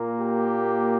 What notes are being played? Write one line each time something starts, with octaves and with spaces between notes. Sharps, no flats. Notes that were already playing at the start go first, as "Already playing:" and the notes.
Already playing: A#2 A#3
G4